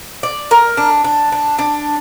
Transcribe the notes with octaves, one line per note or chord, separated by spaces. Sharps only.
D5
A#4
D4
D4
D4
D4